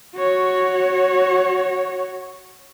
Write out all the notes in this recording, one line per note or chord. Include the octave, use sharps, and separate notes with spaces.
F#4 C#5